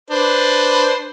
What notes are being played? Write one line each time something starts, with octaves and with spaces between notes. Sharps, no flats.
D4 B4 C5